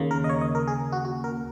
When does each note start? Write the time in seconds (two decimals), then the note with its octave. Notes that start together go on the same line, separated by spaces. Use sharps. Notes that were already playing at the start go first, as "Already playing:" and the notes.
Already playing: D#2 C#3 A#3
0.11 A#4
0.24 D#5
0.29 C#5
0.41 D#5
0.55 A#4
0.68 G#4
0.92 F#4
1.05 F#4
1.24 A#4